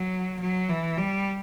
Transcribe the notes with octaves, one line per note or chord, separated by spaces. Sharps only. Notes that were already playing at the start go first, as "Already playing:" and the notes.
Already playing: F#3
F#3
E3
G3